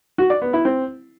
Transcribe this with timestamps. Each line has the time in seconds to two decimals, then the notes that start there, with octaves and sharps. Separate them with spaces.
0.18 F#4
0.30 D5
0.42 B3
0.53 E4
0.65 C4